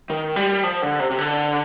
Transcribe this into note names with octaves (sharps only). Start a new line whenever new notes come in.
D#3
G3
F3
D3
C3
C3
D3